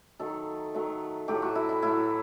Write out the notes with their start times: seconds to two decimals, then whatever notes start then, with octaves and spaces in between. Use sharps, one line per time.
0.19 D#3 F#3 A3 A4
0.74 D#3 F#3 A3
1.28 A2 F#3 A3 G4
1.42 F#4
1.55 E4
1.69 E4
1.82 A2 F#3 A3 E4